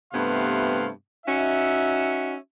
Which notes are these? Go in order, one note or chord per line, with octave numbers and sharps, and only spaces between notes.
G2 C3 A3 B3 F5 C6
C#4 D#4 F#4 E5